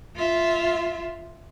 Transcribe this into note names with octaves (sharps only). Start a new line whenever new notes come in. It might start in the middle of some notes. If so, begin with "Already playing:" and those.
F4 E5